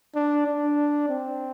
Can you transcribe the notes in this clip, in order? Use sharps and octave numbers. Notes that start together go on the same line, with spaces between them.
D4
D4
C4